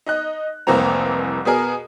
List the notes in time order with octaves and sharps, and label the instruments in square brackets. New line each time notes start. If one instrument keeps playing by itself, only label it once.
[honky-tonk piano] D#4 D#5 F#6
F1 C2 E3 A#3 C4 A#5
B2 B3 G#4 A#4